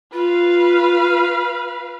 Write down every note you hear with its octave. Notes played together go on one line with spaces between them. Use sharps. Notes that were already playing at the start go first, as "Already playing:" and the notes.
F4 B4 F5